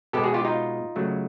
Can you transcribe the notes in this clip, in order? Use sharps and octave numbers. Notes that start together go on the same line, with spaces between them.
B2 G#3 B3 G4 A4
F#4 G#4
F4 G4
D#4 F4
C#3 F#3 A3